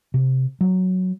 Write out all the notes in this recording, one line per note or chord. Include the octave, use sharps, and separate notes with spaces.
C3
F#3